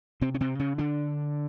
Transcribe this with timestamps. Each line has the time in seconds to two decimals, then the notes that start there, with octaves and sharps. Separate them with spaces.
0.21 C3 C4
0.34 C#4
0.41 C3 C4
0.59 C#3 C#4
0.78 D3 D4